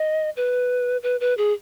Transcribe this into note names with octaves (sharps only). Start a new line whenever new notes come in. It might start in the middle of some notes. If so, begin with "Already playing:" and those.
Already playing: D#5
B4
B4
B4
G#4